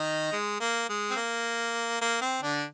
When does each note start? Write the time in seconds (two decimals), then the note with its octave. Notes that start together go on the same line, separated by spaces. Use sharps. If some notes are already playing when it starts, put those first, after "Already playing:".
Already playing: D#3 D#4
0.33 G#3
0.60 A#3
0.89 G#3
1.11 C4
1.16 A#3
2.01 A#3
2.21 C4
2.42 D3 D4